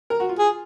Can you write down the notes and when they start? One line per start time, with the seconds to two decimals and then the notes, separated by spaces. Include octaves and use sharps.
0.10 A#4
0.20 F#4
0.29 F4
0.39 G#4